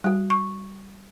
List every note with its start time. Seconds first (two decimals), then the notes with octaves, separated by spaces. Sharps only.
0.04 G3 F#4
0.30 C#6